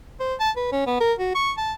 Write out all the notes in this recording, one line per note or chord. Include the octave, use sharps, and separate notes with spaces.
C5
A5
B4
C#4
B3
A#4
F#4
C#6
A5